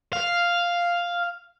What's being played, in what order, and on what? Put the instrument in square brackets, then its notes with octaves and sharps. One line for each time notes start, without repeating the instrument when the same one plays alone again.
[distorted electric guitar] F5